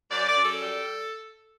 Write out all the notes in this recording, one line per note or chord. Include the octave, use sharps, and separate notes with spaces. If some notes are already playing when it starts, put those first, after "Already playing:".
F#2 D5
D5
F#2
A4
G3